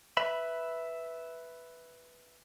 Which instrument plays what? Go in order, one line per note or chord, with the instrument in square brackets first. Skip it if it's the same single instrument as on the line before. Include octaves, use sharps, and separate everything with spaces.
[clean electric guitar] B4 E5 B5